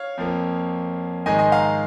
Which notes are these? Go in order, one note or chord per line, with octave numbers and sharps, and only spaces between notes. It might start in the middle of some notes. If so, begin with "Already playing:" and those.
Already playing: C#5 F5
F2 F3 A#3
G#2 D#3 G#3 D#5 G#5
D#5 G#5
F5 A#5